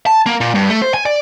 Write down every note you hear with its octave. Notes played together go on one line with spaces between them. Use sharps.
A5
A#3
A#2
G2
A3
C5
G#5
D5